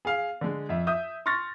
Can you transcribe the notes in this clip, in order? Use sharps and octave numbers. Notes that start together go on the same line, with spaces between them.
G#4 F5
D3 G#3
F2 E5
E5 D#6 G6
C6 C#6 F6 A6 A#6